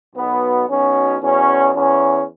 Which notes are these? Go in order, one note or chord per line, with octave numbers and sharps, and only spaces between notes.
B1 B2 B3
B1 B2 C#4
E2 B2 C#4
E2 E3 C#4